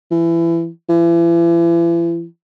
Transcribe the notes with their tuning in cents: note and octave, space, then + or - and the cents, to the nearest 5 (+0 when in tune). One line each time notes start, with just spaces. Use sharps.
E3 +25
E3 +40